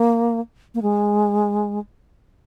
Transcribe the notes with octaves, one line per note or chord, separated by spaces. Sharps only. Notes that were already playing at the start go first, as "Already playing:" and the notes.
Already playing: A#3
A#3
G#3